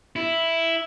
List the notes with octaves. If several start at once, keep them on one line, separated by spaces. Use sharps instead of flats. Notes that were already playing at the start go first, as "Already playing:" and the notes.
E4